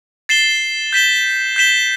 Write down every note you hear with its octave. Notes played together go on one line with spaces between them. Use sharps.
A6 C7 E7 G7
G6 B6 E7 G7
G6 B6 E7 G7